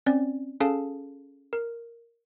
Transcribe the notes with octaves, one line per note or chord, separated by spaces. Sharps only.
C4 C#4 D5
C#4 G#4 A4 F5 A5
A#4